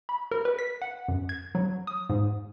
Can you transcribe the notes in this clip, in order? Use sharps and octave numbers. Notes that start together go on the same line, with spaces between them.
B5
A#4
B4
B6
F#5
F#2
G#6
F#3
D#6
G#2